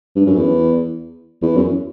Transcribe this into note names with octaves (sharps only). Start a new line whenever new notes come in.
G2
F#2
E2
E2
F#2